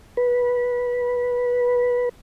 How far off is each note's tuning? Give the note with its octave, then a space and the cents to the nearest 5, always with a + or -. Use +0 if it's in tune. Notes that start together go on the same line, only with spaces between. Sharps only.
B4 -15